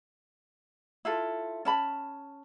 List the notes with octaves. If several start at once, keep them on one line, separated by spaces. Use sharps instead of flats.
E4 F4 A4
C#4 A5 B5